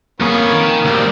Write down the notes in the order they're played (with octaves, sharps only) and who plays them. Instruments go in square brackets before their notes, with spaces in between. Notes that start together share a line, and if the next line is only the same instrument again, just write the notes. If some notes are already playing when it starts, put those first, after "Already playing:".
[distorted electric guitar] F2 G#4 [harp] A#3 [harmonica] B3 C#4
[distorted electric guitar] D#3
[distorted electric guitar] D2 G2 [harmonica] G3 C4